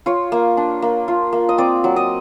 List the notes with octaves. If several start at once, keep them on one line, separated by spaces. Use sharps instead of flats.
F4 C#5
A#3
D4
A#3
F4
A#3
D#5
C4 D5
F#3
D#5